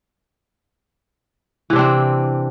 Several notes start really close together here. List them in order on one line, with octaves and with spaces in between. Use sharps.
E3 C3 D4 C4